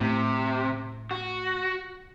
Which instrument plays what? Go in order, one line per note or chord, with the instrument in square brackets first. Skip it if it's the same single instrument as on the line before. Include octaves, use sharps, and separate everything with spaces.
[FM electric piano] A2 [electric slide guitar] C3
[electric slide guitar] F#4